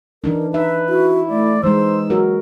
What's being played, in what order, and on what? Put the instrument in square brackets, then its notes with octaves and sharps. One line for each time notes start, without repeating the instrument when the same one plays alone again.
[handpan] E3 D4 D#4 [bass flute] A#4
[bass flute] D#4 [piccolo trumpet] B4 [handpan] E5
[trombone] E4 [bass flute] F#4
[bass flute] A3 [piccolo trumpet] D5
[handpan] E3 G#3 [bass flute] D#4 [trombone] C5 [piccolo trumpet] E6
[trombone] F#3 [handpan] F#4 A#4